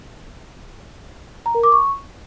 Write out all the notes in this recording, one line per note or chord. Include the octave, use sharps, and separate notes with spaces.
A#5
A#4
D6
C#6